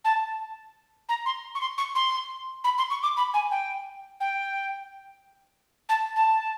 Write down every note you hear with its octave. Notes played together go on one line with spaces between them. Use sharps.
A5
A#5
C6
C#6
C6
C#6
C6
B5
C6
C#6
D6
B5
G#5
G5
G5
A5
A5